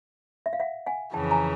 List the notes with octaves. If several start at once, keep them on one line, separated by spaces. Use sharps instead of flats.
E5
F5
E5 F#5
F#5 G#5
F2 C#3 E3 G5 A5
G#5 A#5